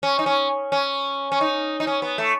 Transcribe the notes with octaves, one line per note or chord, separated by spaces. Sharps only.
C#4
D#4
C#4
C#4
C#4
D#4
D#4
C#4
B3
A3